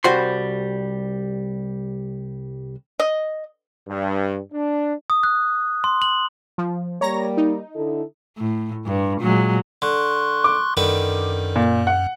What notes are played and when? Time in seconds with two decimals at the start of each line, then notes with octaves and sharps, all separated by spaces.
0.04 C2 G3 F#4 C5 B5 C6
3.00 D#5
3.89 G2
4.53 D4
5.10 D#6
5.23 F#6
5.84 C6
6.02 F#7
6.58 F3
7.01 G3 A#3 C#5 A#5 A#6
7.37 D#4
7.75 D3 E4 A4
8.38 A2
8.86 G2
9.21 A#2 F#3 G#3
9.82 D3 C6 C#6 F#6
10.44 D6
10.77 F#2 D3 D#3 B4
11.56 A#2
11.87 F#5